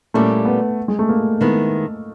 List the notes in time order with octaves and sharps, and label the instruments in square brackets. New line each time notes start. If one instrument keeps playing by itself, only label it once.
[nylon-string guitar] A#2 G3 A#3 C#4 E4 [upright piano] A3
[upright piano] B3
G#3
A3
A#3
[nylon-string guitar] D#3 G#3 B3 E4